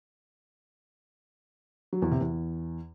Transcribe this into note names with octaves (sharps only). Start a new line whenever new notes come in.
F#3
E2
C3
E2